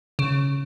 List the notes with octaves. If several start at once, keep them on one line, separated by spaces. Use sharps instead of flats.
C#3